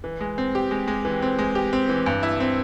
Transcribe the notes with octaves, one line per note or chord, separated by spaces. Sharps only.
E3
G#3
C4
G4
G#3
G#3
E3
C4
G#3
G4
C4
E3
G2
E4
C4